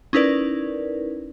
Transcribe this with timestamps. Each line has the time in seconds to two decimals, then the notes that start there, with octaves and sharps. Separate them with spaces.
0.13 C#4 D#4 E4 A#4 B4 D5